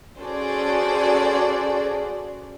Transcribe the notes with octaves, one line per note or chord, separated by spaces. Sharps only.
C#4 F#4 G#4 A4 C5 D5